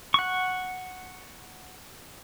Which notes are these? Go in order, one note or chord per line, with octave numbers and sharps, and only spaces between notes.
F#5 C#6